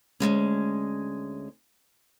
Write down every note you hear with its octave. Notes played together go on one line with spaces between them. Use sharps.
D2 G#2 G#3 C#4